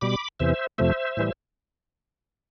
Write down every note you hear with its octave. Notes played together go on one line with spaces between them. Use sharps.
B2 G3 B5 D6
E2 C3 E3 C5 E5
F2 C3 F3 A3 C5 E5
A2 E3 G3